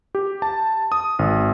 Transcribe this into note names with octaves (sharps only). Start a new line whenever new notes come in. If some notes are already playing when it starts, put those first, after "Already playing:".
G4
A5
D#6
G#1